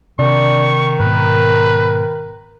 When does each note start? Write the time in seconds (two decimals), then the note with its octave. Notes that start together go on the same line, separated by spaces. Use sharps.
0.19 C3 D#3 D4 C#6
1.00 G#2 B2 A#4 B4